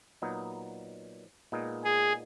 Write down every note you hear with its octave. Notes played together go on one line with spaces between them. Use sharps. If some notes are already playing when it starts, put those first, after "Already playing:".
A#2 F#3 B3 D#4
A#2 G#3 B3 D#4
G#4